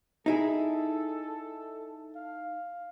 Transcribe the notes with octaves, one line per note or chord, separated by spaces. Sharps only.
D#4 E4 G#4 A4
F5